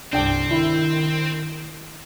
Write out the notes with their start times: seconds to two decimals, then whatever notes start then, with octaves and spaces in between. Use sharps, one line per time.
0.13 C2 G2 C4 D4 G5
0.51 D#3 E4